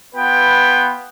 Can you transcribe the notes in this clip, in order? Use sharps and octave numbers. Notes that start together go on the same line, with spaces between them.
B3 F4 B4 G5